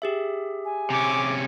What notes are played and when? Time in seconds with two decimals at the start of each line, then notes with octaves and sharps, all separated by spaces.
0.02 G4 G#4 E5
0.64 G#5
0.90 C3 C#4 D6